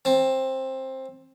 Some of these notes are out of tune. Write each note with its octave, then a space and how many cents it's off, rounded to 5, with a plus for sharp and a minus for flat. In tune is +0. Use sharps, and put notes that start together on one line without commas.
C4 +15 A5 +0